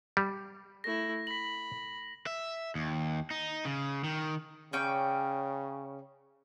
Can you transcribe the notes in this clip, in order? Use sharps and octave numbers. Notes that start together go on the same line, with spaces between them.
G3
A3 E4 A#6
B5 B6 F#7
E5
D#2
D#4
C#3
D#3
C#3 C#4 D5 G5